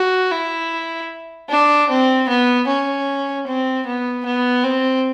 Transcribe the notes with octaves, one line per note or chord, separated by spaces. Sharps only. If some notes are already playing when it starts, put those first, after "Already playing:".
Already playing: F#4
E4
D4
C4
B3
C#4
C4
B3
B3
C4